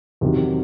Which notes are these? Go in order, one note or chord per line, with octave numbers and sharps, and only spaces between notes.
E2 C3 D#3 F#3